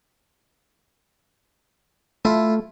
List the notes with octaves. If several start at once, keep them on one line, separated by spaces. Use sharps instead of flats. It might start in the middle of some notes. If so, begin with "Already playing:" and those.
A3 E4 F4